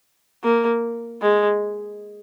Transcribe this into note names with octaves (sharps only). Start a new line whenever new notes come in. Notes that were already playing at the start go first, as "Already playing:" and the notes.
A#3
G#3